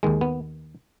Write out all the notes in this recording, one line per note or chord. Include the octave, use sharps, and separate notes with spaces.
D#2 D#3 G#3
B3